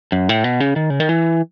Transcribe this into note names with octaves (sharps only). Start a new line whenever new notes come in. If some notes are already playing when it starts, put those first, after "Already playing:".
F#2
A2
B2
C#3
D#3
C#3
D#3
E3